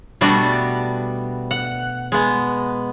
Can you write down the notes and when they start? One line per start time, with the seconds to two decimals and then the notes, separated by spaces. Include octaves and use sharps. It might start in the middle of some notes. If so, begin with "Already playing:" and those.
0.21 B2 G3 A3 B3 D4 F#4
1.51 F#5
2.12 G#3 B3